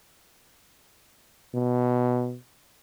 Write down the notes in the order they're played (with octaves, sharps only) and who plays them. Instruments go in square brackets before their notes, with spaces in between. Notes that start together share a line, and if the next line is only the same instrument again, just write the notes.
[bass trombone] B2